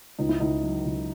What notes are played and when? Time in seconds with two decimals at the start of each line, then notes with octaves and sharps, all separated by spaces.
0.19 C#2 D#4
0.29 E4
0.40 C#2 D#4
0.63 F#3
0.85 C#2